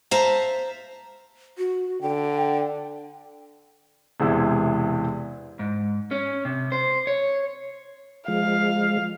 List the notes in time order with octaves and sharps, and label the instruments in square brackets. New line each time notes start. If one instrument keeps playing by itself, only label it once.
[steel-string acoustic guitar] C5 E5 F5 A5 A#5
[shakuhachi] F#4
[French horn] D3 [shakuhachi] G5
[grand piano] E1 C3 E3 G#3 E6
[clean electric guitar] G#2
C#4
C3
C5
C#5
[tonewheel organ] F3 G#3 [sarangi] F5